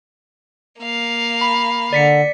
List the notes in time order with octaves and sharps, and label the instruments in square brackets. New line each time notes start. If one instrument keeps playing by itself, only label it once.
[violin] A#3 F5
[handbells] B5
[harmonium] D3 [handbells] D5 B6 C#7